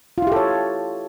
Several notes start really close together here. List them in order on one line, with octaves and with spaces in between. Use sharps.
F4 E4 G4 A4 C#5